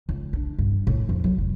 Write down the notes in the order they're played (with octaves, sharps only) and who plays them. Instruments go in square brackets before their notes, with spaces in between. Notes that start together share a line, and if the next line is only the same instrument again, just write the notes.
[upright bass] C#2
D4
G2
A2
F2
F#3
F1